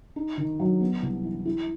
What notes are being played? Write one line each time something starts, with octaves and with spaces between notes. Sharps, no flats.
D#4
D#3
F#3
B3
C2
E3
E4